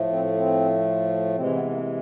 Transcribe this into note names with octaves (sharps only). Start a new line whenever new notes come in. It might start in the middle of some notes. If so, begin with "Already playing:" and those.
Already playing: A2 F3 A3
C4
C4
C3 E3 G#3 C4
B3
B3
A#3